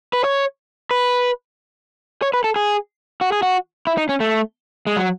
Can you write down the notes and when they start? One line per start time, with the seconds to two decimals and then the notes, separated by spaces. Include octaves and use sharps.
0.13 B4
0.24 C#5
0.91 B4
2.22 C#5
2.34 B4
2.44 A4
2.56 G#4
3.21 F#4
3.32 G#4
3.42 F#4
3.87 E4
3.97 D#4
4.09 C#4
4.20 A3
4.87 G#3
4.97 F#3